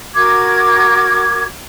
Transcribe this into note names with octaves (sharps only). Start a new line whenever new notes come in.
F#4 A#4 D6 G#6